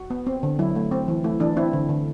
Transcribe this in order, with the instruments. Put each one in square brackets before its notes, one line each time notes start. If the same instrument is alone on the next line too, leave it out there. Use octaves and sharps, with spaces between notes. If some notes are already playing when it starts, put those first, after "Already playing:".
Already playing: [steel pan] F#4
B3
C4
D3
F#3 E4
A3
C4
E3
A3 E4
E3 D4
C4 E4
D3
D3